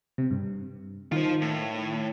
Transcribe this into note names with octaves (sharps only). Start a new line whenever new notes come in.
C3
G2
D#3 F4 C5
A2